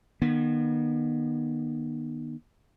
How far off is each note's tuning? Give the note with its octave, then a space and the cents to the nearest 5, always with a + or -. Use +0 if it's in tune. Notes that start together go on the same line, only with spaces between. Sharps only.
D#3 -35 B3 -40